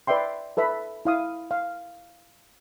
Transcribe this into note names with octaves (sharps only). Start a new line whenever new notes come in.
B4 D5 E5 G5 C6
A4 B4 E5 B5
E4 F5 D#6
F5